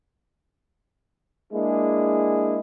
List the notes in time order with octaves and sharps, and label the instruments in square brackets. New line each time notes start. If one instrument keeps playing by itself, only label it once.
[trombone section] G#3 A#3 D4 E4 G#4